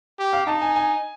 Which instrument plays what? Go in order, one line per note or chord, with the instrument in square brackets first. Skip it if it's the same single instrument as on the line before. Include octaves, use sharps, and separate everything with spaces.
[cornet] G4
[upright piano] F5
[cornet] D#4 [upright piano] A5
[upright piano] G#5
G#5